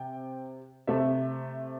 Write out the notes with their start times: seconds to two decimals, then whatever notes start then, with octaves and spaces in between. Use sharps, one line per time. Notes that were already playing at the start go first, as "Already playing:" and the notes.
Already playing: C3 G5
0.87 C3 A3 E5